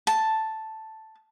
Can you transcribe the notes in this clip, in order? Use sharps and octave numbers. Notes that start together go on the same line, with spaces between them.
A5